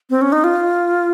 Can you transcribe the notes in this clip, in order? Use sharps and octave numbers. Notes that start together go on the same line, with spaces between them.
C4
C#4
D#4
F4